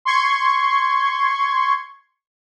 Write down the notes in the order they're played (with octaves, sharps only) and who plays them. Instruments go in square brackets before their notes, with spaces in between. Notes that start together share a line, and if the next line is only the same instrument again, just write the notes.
[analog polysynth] C6 C#6 G#6